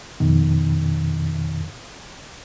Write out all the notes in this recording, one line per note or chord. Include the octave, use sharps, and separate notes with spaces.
F2 B2 D#3